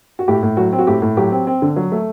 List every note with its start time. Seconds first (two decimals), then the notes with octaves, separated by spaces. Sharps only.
0.19 F#4
0.28 A2 G4
0.43 A2
0.57 F#3 F#4
0.73 C4
0.79 F#4
0.87 A2 G4
1.02 A2
1.17 F#3 G4
1.32 C4
1.47 C4
1.62 D3
1.76 F#3
1.92 A3